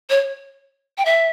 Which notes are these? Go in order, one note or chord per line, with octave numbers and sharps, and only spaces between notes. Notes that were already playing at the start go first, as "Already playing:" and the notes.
C#5
G5
E5